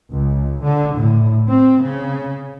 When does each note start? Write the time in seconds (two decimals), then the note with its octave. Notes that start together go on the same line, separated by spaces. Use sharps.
0.10 C#2
0.62 D3
0.96 A2
1.47 C4
1.81 C#3